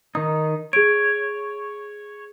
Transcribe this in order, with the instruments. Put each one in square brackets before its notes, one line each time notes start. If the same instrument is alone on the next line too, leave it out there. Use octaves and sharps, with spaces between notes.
[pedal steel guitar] D#3 D#4 [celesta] D#6
[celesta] G#4 D7 [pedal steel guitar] C#5